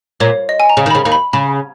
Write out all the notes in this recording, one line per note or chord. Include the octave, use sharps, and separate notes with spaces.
A#2 C#5
D#5
G#5
A#5
C#3
D#3
C#3 B5
D#2 D#3
B5
C#3 B5